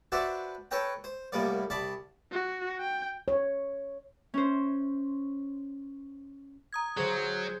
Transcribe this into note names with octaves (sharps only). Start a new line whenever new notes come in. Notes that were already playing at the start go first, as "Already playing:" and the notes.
D4 F#4 B4 C5 D5 E5
A4 B4 C#5 G5 A#5
C5
C2 A2 G3 A#3 B3 D5
C2 D5 A5 B5
F#4
G5
C#5
C#4 C5
A#5 D#6 G#6
D3 F#3 G#4 C5 G#6